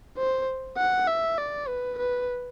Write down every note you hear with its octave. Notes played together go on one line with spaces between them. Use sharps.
C5
F#5
E5
D5
B4
B4